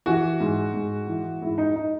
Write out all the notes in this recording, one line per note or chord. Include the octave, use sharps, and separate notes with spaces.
E3 F#4
G#2
G#2
E3
G#2 E4
D#4
D#4